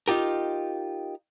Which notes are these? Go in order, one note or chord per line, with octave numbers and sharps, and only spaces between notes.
D#4 F4 G4 A#4